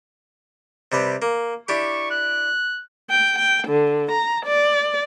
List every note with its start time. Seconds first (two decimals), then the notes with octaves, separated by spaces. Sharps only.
0.92 C3 G3 B4
1.22 A#3
1.68 D4 E4 G4 C#6
2.11 F#6
3.10 G5
3.38 G5
3.68 D3
4.11 A#5
4.45 D5